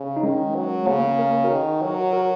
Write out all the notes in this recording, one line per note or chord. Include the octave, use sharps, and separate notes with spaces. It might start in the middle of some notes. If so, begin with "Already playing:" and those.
Already playing: C#3
D#4
D#3 G#3 C#4
F#3
C#3 A#3
A#3
A#4
F#4 A#4
D#3
F#3 F#4 A#4
F#4 A#4